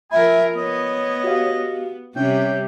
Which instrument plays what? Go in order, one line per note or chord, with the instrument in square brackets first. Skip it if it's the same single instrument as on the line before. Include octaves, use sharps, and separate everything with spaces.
[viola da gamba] F3 A#4 [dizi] E5 [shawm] G#5 [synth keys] B5
[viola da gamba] B3 [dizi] C#5 [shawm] D#5
[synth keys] F#4 G4 F5
[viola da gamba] C3 G3 [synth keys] C#4 [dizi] C#5 [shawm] G5